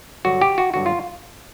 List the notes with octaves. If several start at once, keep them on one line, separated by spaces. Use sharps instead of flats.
G2 D3 F#3 F#4
G4
F#4
G2 D3 F#3 F#4
F4